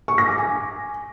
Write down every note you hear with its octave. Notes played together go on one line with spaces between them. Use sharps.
C#6
A#6
D6
G#5